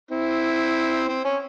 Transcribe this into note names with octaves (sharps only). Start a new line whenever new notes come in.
C4 E4
C4
C#4